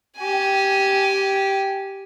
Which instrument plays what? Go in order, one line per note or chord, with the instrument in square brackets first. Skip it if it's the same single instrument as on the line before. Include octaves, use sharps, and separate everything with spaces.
[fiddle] G4 G#5